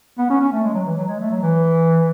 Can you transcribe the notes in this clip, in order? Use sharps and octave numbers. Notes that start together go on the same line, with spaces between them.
B3
C#4
C#4
A3
G#3
F#3
E3
F#3
G#3
A3
F#3
E3